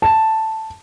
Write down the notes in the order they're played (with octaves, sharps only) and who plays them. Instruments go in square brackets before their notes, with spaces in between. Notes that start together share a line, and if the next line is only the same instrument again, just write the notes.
[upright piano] A5